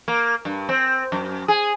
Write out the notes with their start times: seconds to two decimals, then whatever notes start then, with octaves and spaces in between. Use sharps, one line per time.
0.08 A#3
0.45 G2
0.69 C4
1.12 F#2
1.48 G#4